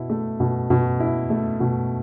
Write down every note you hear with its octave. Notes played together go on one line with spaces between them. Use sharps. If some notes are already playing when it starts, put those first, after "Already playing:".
Already playing: B2 E4
A3
B2
B2
E4
A3
B2